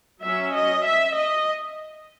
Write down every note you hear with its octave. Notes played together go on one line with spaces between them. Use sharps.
F#3 C#4 E5
D#5
E5
D#5